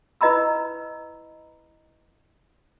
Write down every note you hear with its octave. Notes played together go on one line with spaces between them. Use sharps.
E4 B4 D#5 A#5 B5 E6